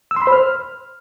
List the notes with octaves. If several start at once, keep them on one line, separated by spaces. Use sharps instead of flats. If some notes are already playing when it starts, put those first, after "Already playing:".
E6
C6
B5
C5
F6